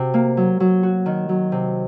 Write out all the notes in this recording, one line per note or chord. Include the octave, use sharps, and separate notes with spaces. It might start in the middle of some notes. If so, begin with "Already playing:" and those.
Already playing: C3 F#4
A#3
F#3
F#3
F#4
D#3
F#3
C3